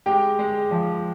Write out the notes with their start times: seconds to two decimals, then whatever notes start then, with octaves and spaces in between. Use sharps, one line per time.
0.06 G#3 G4 G5
0.39 G#3
0.71 F3